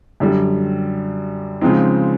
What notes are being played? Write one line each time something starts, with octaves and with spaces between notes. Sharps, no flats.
F#2 D3 G3
C#3 F3 G#3 C4 D#4